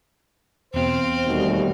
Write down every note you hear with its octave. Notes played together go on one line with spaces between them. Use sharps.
E2 B2 C4 C5 F5
D#2 G3 A3 F#4